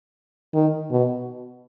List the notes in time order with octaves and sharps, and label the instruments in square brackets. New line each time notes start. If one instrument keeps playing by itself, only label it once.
[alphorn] D#3
B2